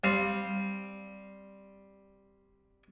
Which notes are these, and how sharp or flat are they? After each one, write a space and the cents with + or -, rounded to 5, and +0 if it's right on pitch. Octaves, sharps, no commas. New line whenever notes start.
G3 +0 C4 +0 F5 +0